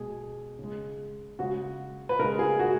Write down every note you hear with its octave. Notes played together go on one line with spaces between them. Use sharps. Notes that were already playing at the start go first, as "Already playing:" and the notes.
Already playing: B2 G#3 G#4
C#3 G#3
C#3 G#3 F#4
B4
C#3 G#3 A#4
G#4
F#4